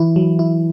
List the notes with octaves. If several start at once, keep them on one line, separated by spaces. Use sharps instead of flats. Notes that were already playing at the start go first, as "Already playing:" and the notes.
Already playing: E3 E4
F#3
E4